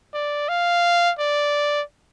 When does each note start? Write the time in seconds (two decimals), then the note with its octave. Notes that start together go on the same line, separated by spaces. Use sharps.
0.14 D5
0.49 F5
1.19 D5